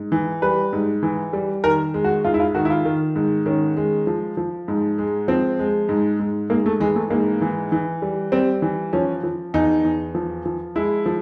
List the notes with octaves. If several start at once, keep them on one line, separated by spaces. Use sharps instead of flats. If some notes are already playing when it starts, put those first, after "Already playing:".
Already playing: G#2
E3
G3 B4
G#2
E3
G3
D#3 A#4
G#3
F#4
G#2 F4
E4
F4
D#3 F#4
E4
F4
D#3
G#2
D#3 C#4
G#3
F3
F3
G#2
G#3
F3 C4
G#3
G#2
G#2
G#2 A#3
A3
E3 G#3
A3
G#2 A#3
E3
E3
G3
G3 C4
E3
F3 C#4
F3
E2 D#4
E2
F3
F3
G#3 E4
F3